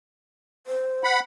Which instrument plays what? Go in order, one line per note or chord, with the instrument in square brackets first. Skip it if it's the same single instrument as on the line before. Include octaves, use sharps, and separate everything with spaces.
[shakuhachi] C5
[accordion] F#5 B5